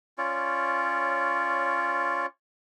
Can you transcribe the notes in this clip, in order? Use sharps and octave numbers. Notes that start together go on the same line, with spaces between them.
C#4 F4 C#5 D5